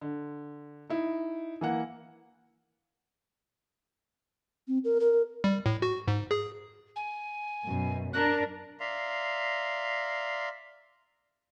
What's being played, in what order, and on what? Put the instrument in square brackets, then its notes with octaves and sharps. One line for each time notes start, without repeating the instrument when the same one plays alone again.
[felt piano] D3
D#4 E4
E3 A#3 F#5
[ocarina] C4
A#4
A#4
[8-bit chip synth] G3
A2
F#4
G#2
G#4
[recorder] G#5
[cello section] F#2 B2
[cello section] D4 A#4 [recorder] F#6
[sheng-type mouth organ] D5 E5 F5 A#5 C6